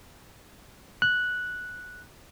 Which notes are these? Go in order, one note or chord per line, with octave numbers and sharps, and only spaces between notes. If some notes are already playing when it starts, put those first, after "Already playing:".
F#6